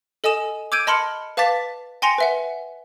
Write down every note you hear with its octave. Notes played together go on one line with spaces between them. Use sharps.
A4 D#5 G#5 D#6 E7
D6 E6 G6 G#6 D7 D#7
D#5 A5 B5 C6 F6 C#7
B4 F5 A5 D6 A6 B6
G5 G#5 C6 A#6 C#7 F7
B4 E5 F#5